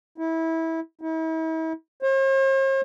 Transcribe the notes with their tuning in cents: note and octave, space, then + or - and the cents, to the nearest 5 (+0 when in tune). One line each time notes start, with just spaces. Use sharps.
E4 -20
E4 -40
C5 +45